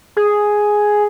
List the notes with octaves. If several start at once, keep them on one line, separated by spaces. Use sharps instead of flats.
G#4